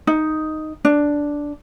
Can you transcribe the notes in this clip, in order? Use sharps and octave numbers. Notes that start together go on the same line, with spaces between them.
D#4
D4